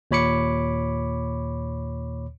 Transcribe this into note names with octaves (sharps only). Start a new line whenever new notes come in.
D#2 A#2 C#5 B5 D6 C#7